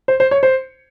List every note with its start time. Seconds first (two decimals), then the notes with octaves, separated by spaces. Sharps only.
0.08 C5
0.20 C5
0.31 C#5
0.43 C5